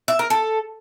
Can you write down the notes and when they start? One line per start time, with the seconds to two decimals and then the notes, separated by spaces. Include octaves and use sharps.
0.08 E5
0.19 A#4
0.30 A4